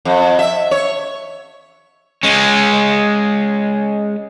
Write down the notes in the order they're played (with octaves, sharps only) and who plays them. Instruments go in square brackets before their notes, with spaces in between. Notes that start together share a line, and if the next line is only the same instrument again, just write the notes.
[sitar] F2
E5
C#5
[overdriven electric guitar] G#3 C#4